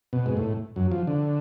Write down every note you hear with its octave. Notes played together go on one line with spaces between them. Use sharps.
B2
G#2
A2
F#2
F3
D3